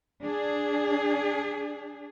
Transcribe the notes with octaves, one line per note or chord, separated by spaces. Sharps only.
D4 G#4